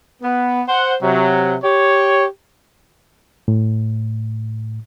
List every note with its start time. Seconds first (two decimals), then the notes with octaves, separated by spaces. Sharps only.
0.22 B3
0.68 C5 F#5
1.02 C3 F#3
1.63 G4 C#5
3.48 A2